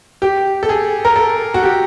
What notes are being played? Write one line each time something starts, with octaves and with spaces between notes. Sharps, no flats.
G4
A4
G#4
A#4
A4
F#4
G4